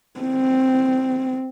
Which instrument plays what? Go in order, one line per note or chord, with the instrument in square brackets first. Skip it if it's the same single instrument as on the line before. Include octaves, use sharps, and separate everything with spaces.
[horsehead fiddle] C4